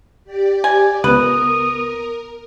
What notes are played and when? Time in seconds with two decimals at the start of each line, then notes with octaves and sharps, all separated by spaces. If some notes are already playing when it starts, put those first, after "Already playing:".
0.24 G4 D5
0.64 G#5
1.04 C#2 B3 A#4 B4 D#6